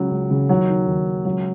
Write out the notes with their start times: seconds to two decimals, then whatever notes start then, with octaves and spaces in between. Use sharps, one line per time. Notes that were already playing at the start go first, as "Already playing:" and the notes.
Already playing: C#2 C#3 F#3
0.11 C#2
0.31 C#3
0.49 D#2 F#3
0.69 D#3
0.87 D#2
1.06 D#3
1.25 C#2 F#3